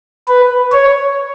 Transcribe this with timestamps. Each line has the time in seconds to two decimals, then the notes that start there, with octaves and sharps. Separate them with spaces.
0.28 B4
0.72 C#5